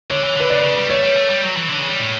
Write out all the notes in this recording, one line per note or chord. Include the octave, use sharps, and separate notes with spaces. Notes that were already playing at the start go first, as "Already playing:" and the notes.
D3 C#5
E3
D3 B4
C#3 D5
C#3
G3
A3 C#5
G3
A3
G3
F#3
E3
D3
C#3
G3
A2